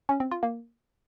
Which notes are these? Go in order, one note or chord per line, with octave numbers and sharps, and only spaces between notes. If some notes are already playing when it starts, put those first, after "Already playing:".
C#4
C4
F4
A#3